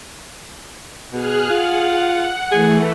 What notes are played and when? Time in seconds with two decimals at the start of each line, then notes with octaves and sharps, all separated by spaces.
1.13 B2 G#4 F6 F#6
1.50 F4 F#5
2.51 E3 A3 G#4